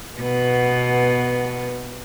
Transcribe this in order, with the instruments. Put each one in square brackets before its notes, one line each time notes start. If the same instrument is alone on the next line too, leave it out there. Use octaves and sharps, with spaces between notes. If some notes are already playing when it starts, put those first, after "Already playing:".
[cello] B2 B3